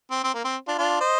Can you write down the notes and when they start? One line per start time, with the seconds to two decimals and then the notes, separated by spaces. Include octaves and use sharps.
0.11 C4
0.24 C4
0.35 A#3
0.45 C4
0.67 D4 F4
0.78 D4 F4
1.00 C5 D#5